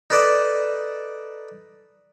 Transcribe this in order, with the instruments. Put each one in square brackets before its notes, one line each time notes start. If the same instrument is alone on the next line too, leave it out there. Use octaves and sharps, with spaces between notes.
[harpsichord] D#4 A4 B4 D5 D#5 A5